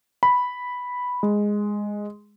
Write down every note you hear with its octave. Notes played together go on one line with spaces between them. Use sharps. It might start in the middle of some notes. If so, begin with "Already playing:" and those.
B5
G#3